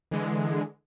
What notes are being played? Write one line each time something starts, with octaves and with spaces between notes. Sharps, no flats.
D3 E3 G#3